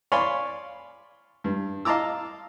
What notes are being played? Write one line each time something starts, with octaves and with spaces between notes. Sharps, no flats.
C#5 D5 F5 G#5 B5 C6
G2
D#5 F5 A5 A#5 D6 E6